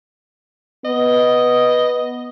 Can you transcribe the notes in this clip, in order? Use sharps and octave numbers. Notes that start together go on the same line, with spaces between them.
B3 D#5